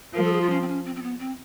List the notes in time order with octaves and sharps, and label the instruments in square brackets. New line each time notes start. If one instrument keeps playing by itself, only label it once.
[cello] F3 [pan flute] A#4
[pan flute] A4
G#4
F4
C#4
C4
C#4
C4
C4
B3
C4